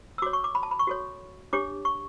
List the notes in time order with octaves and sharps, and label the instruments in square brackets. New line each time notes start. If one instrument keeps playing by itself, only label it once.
[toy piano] E6
F#4 C#5 D6
C#6
D6
B5
A5
B5
C#6
F#4 A4 C#5
D4 G4 C#5 D6
C#6